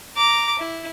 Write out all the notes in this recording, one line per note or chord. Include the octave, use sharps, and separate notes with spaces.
A#5 D6
E4